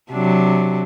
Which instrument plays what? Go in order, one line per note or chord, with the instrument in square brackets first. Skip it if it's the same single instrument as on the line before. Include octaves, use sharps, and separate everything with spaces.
[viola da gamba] C3 F#3 D4